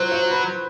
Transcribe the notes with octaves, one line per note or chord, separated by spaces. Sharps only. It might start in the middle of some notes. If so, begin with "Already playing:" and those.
Already playing: F#3 C5
C5
B4